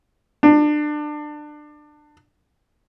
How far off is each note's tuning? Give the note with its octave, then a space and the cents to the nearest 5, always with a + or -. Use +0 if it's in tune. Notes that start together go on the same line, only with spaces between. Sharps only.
D4 +25